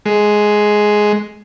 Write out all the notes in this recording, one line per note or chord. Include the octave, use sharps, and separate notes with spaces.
G#3